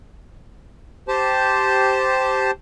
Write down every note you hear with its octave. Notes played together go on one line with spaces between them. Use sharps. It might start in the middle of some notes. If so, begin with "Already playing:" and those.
G4 C5 A5